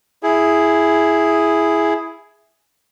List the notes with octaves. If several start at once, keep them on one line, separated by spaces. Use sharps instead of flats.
E4 G#4